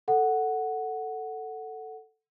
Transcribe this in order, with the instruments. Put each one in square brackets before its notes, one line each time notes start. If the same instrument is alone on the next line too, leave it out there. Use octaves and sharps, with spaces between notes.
[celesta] A4 F#5